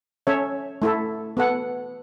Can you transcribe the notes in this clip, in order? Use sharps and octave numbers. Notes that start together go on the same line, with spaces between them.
C#4 A4 C#5 E5
A3 E4 A4
B3 A4 F#5